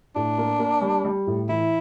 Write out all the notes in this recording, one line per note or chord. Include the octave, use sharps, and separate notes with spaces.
A2 D4
A#3
A#3
G3
G3
A2
E3 E4